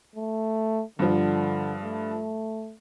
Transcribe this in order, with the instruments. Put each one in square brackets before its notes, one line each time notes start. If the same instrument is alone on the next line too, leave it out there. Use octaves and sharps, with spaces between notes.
[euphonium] A3
[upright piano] G2 F3 [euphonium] D3
[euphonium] A3